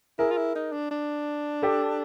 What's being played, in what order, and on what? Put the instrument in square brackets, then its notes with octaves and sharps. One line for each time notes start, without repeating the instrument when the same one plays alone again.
[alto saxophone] E4 [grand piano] G#4 A#4
[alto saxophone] F4
E4
D#4
D4
D4
[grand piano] G4 A4